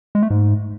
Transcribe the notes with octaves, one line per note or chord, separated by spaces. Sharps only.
G#3
A3
G#2